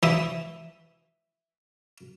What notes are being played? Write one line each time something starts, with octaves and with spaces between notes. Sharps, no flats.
E3 E5 D#6